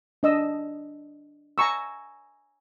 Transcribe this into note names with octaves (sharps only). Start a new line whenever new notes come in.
D4 D#5 E6
G#5 A#5 C#6 E6